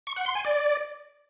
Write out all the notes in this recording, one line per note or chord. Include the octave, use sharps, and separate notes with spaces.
C#6
F#5
C6
G#5
D5